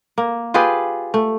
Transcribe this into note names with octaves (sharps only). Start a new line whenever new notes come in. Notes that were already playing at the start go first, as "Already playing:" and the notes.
A#3
F4 G4 G#4 B4
A3